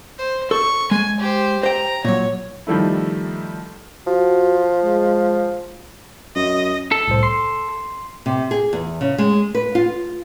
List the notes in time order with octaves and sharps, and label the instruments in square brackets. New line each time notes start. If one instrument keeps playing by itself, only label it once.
[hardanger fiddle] C5
[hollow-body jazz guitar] A4 [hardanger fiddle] C#6
[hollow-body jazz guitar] G#3 [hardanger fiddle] G#5
[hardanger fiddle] G4 C5
[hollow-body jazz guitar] C5 G5 [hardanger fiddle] A#5
[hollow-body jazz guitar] A#2 F#3 [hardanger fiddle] C#5
[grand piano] D#3 F3 G3 A3 E4
[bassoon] F3 [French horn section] F#4
[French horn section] G#3
[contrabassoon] F#2 [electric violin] D#5
[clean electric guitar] A4
[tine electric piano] C2 A2 C5
C6 C7
[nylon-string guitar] C3
G#4
E2
C#3
G#3
B4
F4